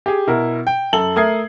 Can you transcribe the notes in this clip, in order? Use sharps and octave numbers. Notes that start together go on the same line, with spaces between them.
G4 G#4
B2 E4 A#4
G5
F#2 A4 F#7 G7
A3 A#4 D#6 G#6 C7